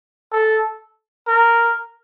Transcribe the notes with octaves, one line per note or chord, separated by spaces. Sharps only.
A4
A#4